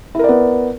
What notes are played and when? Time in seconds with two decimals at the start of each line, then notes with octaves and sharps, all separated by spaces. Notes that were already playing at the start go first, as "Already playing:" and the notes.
0.15 E4
0.19 A#4
0.24 D5
0.28 B3